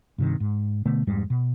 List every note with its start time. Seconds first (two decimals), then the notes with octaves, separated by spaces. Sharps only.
0.18 G2 C3 D#3
0.40 G#2
0.85 B2 D3 A3 B3
1.07 F2 G#2 G3 G#3
1.30 B2